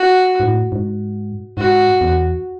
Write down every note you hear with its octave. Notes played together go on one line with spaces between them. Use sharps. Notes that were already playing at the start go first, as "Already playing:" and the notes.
Already playing: F#4
G#2
A2
G#2
G#2 F#4
E2